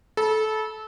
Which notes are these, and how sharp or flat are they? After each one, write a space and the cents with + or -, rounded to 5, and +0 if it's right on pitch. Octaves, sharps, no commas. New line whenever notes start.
A4 -20 B5 -35